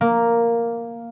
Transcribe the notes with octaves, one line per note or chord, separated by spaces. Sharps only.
A#3